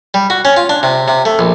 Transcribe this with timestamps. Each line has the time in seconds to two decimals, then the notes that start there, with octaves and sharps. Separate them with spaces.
0.14 G3
0.30 F#4
0.45 C#4
0.57 F4
0.69 D4
0.83 C3
1.08 C3
1.25 A3
1.39 A#1